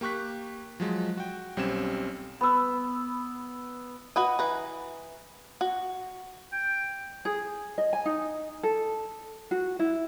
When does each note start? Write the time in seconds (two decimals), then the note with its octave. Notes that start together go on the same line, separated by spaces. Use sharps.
0.01 A#3 G4 C#6 F#6 B6
0.80 F3 F#3 G#3
1.17 F#4 G5
1.57 B1 G3 C4 C#4 G#6 E7
2.41 B3 E6
4.16 F#4 B4 D#5
4.39 E3 B4 A#5
5.61 F#4
6.52 G5
7.25 G#4
7.78 D#5
7.93 G#5
8.05 D#4
8.63 A4
9.51 F#4
9.79 E4